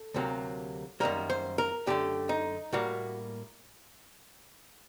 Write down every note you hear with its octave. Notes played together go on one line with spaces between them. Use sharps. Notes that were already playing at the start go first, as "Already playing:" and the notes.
Already playing: A4
D2 C3 F#3 A#3
F#2 D#3 G3 A#3 A#4
C5
A#4
F#2 D3 A3 G4
D#4
A2 G3 A#3 F#4